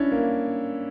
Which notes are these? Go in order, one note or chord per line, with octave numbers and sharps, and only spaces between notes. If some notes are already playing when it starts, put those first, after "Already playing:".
Already playing: C#4 D4 E4
A#3